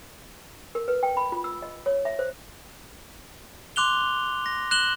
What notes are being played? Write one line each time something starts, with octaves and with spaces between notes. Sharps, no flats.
A#4
B4
G5
B5
F4
E6
D#5
C#5
E5
C5
C6 D6 F#6 F7 G7
A#6
F#6 E7 F#7 G7